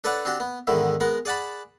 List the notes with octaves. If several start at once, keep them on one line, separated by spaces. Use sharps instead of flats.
D4 A4 B4 C#5 D5 F#5
C4 D4 F#4 G4
B3
E2 G#2 D3 D#3 E4
G#3 B3 A#4 F#5
G#4 D5 F#5 A5 B5